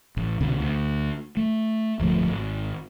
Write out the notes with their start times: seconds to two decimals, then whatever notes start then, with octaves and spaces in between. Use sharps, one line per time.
0.17 A1
0.41 C2 B2 D3
0.60 D2
1.37 A3
2.00 D1 G1 F3 A3
2.31 G#1